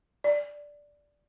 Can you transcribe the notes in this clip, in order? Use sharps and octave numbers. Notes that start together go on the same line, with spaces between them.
D5